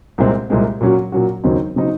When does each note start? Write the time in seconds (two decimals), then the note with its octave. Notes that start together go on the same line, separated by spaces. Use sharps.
0.18 C2 A#2 G#3 C4
0.50 C2 A#2 G#3 C4
0.81 A#2 F#3 C#4 F#4
1.12 A#2 F#3 C#4 F#4
1.44 D#2 C#3 F#3 C4 D#4
1.76 C#3 F#3 C4 D#4